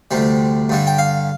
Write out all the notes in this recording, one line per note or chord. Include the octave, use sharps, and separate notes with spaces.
D2 C3 G3
G2 D3 G3
G5
F5